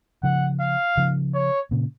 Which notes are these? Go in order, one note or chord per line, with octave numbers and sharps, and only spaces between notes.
C#3 F3 F#5
F5
C#3 F3
C#5
A#2 C#3